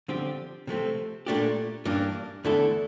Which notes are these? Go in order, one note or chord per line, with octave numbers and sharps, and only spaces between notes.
D3 F3 C4 G4
C3 F3 A3 C4
A#2 A3 D4 G4
G2 E3 A#3 D4
E2 D3 A3 E4 A4